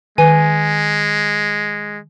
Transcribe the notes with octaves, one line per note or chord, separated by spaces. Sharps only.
D#3 G#3 B4 G#5